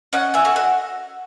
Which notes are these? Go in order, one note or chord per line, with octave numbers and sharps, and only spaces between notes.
C#4 D#5 F#5
E5 G#5
F#4 A4
D#5 F#5